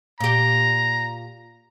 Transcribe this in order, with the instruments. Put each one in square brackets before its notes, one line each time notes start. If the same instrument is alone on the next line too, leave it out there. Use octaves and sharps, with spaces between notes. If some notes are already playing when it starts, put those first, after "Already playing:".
[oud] A#2 G4 [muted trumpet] A#5